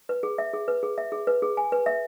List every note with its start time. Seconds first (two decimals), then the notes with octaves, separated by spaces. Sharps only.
0.09 B4
0.23 G#4
0.38 E5
0.53 G#4
0.68 B4
0.83 G#4
0.98 E5
1.12 G#4
1.27 B4
1.42 G#4
1.57 G#5
1.72 B4
1.86 E5